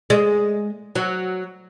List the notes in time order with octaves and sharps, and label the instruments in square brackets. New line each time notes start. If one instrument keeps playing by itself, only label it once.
[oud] G#3
F#3